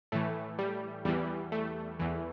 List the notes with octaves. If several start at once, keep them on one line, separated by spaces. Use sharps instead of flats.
A2 E3 A3
G3
E2 E3 G3
A3
E2 E3